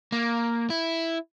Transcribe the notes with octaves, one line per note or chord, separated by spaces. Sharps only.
A#3
E4